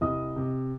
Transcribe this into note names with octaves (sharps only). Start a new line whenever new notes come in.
C2 D#5 D#6
C3